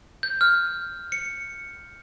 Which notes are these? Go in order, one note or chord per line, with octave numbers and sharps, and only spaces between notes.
G6
F6
C#7